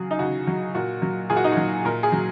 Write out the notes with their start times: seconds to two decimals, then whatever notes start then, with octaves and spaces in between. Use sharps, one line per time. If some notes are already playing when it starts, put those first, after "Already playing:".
Already playing: C#3 F#3 G#4
0.11 D#4
0.19 C#3 F#4
0.47 F#3
0.75 A#2 F#4
1.02 F#3
1.30 A#2 G#4
1.36 F#4
1.44 D#4
1.52 F#3 F#4
1.85 A#2 A#4
2.03 G#4
2.12 F#3